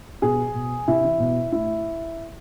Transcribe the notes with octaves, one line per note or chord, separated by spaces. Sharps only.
B2 G#4
B2
C3 E4
E3
B2
A2 E4